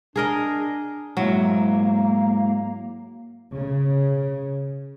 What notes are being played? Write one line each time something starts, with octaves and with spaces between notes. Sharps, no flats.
D4 G#4 A#4 D#5
G#2 F#3 A#3 E4
C#3